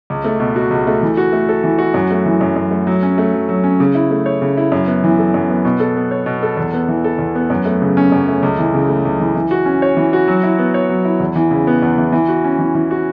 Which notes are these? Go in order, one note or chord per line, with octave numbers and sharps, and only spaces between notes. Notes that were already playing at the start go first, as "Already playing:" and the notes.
C#2
A3
B2
F#4
C#2
A3
E3
F#4
A3
A4
E3
F#4
F#2
A3
E3
F#2
F#2
A3
F#3
C#4
A3
F#3
F#3
C#4
C#3
E4
A3
C#5
C#3
E4
F#2
B3
E3
A4
F#2
B3
B2
A4
B3
C#5
B2
A4
E2
B3
E3
A4
E2
B3
F#2
A3
C#3
C#4
F#2
A3
C#2
E3
C#3
A3
C#2
E3
E3
F#4
C#4
C#5
E3
F#4
F#3
E4
B3
C#5
F#3
E4
E2
E3
C#3
B3
E2
E3
E3
F#4
C#4
E3
E3
F#4